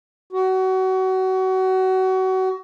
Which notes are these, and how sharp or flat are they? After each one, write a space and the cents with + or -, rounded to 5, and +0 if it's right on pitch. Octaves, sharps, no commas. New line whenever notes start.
F#4 +25